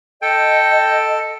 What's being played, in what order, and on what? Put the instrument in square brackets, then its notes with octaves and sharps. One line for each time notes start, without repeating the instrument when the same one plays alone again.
[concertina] A4 [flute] D#5 [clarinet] G5